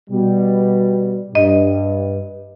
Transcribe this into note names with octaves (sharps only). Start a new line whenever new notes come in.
B2 G3
G2 D#5